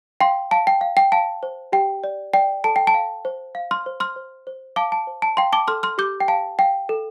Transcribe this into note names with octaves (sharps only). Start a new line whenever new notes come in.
F5 G5 C6
F5 A5
G5
F5
G5
F5 A5
C5
G4 G5
D5
D5 G5
A4 A5
G5
A5
F5
C5
F5
C6 F6
C5
C6 F6
C5
C5
F5 A5 D6
A5
C5
A5
F5 G5 C6
A5 D6
A4 C6 F6
C6 F6
G4 D6 G6
G5
F5 A5
F5 G5
A4